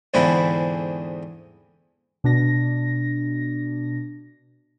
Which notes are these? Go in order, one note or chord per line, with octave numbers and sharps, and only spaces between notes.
E2 G#2 D3 E3 C4 E4
B2 D4 A#6